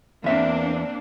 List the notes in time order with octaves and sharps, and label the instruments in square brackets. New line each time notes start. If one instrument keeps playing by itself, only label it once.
[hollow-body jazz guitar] E2 E5 [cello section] A#3 C4 D4